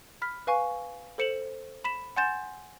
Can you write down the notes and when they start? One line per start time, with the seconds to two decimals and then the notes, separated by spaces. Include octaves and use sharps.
0.22 B5 F6 B6
0.47 B4 F5 G#5 C#6
1.18 A4 C5 C#7 E7 F#7
1.84 B5 B6 E7
2.16 F#5 G#5 C6 G6 A6 E7